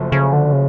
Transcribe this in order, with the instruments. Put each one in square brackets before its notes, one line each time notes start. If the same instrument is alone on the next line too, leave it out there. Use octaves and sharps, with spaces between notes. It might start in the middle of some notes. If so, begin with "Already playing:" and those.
Already playing: [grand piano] F#1 F#2 F3 A3
[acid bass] C#3
D3
C#3